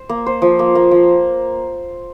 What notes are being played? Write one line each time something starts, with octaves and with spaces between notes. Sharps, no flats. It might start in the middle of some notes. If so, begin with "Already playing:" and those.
Already playing: C5
A#3
C5
F3
A#3
A#3
F3